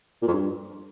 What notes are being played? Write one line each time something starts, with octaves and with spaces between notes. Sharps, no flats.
A#2
F2
G2